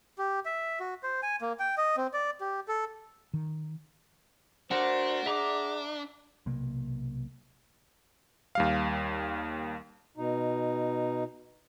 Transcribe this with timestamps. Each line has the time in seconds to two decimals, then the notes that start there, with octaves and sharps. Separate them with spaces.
0.18 G4
0.45 E5
0.80 F#4
1.03 C5
1.23 G#5
1.41 A#3
1.59 G5
1.77 D#5
1.97 C4
2.14 D5
2.41 G4
2.68 A4
3.34 D#3
4.71 A3 D4 F#4 A#4 C5 F#5
5.26 G#4 E5 A#5 D6
6.46 B1 C3 A#3
8.55 D#2 G3 F5
10.17 B2 D#4